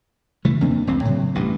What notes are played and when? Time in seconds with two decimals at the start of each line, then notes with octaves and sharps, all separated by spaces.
0.45 C#3 E3 A3
0.61 F2 A#3 C4 D4
0.87 E1 C#2 C4
1.05 A2 C#3 F#3
1.35 A1 G2